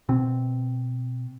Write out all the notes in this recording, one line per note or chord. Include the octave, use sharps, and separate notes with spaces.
B2 C4